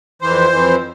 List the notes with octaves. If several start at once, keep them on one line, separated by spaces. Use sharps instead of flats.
F2 E3 C5
F2 E3